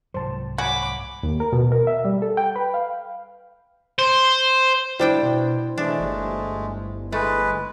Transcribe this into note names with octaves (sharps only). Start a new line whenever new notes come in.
C2 G#2 F#3 C5 A5
F#4 C#5 G#5 B5 D6
D#2
A#4
B2
A#4
E5
G3
A4
G5
B4
F5
C5
G3 D4 E4 C5 G5
B2
E3 G#3 A3 D4
G1
G#3 A3 B4